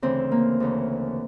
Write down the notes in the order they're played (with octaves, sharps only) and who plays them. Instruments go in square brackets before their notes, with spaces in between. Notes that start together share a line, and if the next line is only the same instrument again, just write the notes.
[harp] D2 C#3 E3 C4
A#3
D2 C#3 E3